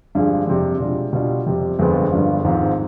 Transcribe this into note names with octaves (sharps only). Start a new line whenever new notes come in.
G2 D3 F3 G#3
F2 C3 G3
B2 G#3 D4 F4
B2 G3 D4 F4
F2 C3 G3
G1 F2 D3 G#3 B3
G1 G2 F3
G#1 G#2 F3 C4